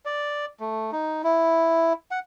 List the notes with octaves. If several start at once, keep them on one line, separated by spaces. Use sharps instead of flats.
D5
A3
D#4
E4
F#5